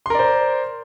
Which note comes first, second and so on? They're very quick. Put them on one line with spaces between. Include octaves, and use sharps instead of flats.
C6 A#4 D5 C5